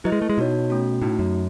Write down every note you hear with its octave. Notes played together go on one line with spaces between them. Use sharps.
F#3 E4 B4 D#5
G#3
A3
G#3
B2 D#4 F#4 C#5
A3 C#4 F#4
A2 A3 D#4 F#4
F#2